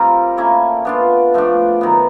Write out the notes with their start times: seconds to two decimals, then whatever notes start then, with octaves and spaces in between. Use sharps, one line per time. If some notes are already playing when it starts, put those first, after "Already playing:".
Already playing: G3 C4 F4 A#4
0.37 A#3 C#4 E4 A4
0.85 B3 D4 F4
1.34 F3 A3 D4
1.81 D#3 F#3 B3